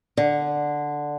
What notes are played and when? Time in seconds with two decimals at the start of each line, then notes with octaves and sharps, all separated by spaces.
0.17 D3